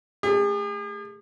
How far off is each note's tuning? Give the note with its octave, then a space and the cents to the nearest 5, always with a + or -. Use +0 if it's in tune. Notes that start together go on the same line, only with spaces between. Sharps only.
A3 +0 G#4 -45